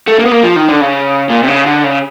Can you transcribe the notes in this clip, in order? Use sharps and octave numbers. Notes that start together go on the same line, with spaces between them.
A3
A#3
B3
A#3
F3
D#3
D3
C#3
A#2
C3
C#3
D3
C#3